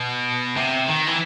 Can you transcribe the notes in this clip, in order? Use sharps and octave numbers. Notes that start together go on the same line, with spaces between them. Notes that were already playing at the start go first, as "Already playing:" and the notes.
Already playing: B2
C3
D#3
E3